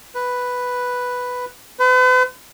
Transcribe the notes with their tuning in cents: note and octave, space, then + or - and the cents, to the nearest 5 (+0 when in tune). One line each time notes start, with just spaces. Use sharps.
B4 +0
B4 +45